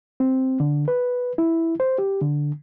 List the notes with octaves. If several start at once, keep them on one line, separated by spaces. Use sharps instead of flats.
C4
D3
B4
E4
C5
G4
D3